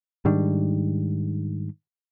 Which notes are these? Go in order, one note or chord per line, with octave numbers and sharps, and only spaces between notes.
G#2 D#3 G3 D4